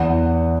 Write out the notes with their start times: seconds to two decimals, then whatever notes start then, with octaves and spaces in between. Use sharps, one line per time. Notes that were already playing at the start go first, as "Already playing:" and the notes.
Already playing: E2 F#5